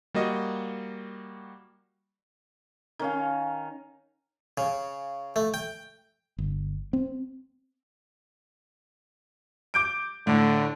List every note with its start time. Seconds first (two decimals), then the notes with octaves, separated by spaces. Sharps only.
0.14 G3 A#3 F#4 D#5
2.99 D#3 C#4 F5
4.58 C#3
5.36 A3
5.54 G5
6.38 G1
6.93 C4
9.74 D6 G6 D7
10.27 A2 D3